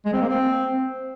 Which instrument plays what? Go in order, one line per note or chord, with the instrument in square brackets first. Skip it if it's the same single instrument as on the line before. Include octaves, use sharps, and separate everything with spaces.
[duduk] G#3
C4
A#3
C4